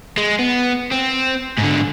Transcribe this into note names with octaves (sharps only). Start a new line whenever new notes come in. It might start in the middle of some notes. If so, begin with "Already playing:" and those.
G#3
B3
C4
G#2 D3